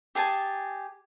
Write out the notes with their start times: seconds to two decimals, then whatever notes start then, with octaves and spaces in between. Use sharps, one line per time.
0.15 G4 G#4 G#5 A5